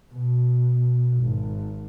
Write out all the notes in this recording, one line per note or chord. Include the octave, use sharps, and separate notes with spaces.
B2
G#1